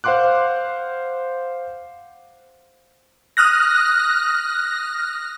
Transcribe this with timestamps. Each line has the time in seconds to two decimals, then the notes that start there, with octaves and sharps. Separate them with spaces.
0.04 C5 F5 F#5 C6 D6 F#6
3.37 D#6 F6 F#6 A#6